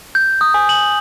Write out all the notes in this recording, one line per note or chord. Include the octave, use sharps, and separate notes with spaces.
G6
D#6
G#5
F#7